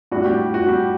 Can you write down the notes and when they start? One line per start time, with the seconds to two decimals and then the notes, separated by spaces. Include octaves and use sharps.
0.12 A2 G3 D4 F#4
0.26 G3 G4
0.54 F#4
0.68 G3 G4